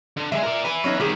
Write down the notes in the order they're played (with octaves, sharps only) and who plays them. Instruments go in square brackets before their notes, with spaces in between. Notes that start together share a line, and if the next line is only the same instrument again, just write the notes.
[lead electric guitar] D3
[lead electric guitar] F#3 G#3 [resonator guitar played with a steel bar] E5
[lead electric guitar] A#4 D5
[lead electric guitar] E4 B4 [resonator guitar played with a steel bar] G#5
[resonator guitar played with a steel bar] F#3 C#4 D#4
[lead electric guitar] C2 D#3 [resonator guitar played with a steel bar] G4 G#4